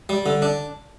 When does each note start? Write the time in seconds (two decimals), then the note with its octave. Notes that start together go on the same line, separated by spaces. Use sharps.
0.09 G3
0.26 D3
0.42 D4